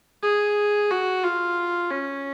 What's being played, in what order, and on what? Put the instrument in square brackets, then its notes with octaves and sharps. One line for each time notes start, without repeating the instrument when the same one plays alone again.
[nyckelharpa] G#4
F#4
F4
C#4